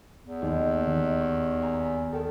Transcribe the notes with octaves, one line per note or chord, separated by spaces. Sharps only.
E2
D#2
D#3
C#6
G#5 A#5 A#6
D#3 A4